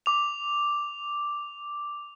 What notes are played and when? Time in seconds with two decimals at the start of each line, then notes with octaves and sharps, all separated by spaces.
0.06 D6 F7